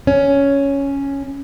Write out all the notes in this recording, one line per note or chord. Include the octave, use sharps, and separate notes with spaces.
C#4